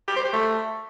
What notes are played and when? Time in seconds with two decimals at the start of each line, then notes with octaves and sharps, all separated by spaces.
0.08 G4
0.16 C5
0.24 G4
0.33 A3